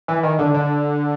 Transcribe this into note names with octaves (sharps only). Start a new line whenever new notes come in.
E3
D#3
D3
D3